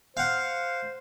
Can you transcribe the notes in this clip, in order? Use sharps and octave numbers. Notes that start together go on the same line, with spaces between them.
C5 F5 F#5